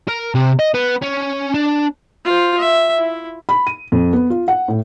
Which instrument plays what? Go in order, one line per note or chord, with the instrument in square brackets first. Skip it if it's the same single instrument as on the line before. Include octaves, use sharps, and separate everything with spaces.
[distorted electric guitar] A#4
C3
D#5
B3
C#4
D4
[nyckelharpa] F4 C5
E5
E4
[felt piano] B5
D#7
F2
B3
F4
F#5
A2